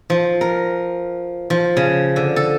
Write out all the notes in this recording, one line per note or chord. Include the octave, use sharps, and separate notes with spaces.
F3
A#4
F3
C#3
D3
A4